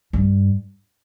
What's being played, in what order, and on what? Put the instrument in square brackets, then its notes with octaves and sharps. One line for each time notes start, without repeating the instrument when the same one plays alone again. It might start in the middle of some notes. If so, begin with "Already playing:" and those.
[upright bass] G2